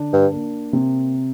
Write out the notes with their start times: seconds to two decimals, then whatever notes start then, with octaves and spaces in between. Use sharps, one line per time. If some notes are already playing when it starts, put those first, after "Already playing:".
Already playing: D3 D4
0.13 G2
0.33 A#3
0.73 C3